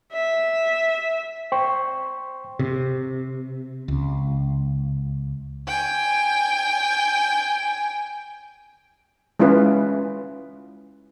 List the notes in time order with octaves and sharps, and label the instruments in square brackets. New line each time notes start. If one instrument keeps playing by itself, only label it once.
[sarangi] E5
[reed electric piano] C5 G5 C6 C#6
[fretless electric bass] C3
C#2
[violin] G5 G#5
[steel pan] G#3 C#4 E4 F4 B4